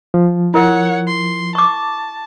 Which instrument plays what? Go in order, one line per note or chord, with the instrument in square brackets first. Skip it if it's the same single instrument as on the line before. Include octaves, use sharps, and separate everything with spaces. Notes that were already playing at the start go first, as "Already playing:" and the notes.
[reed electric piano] F3
[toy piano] E4 A#4 [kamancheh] C#5 F#5
[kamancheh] C6
[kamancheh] A5 [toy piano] C#6 D6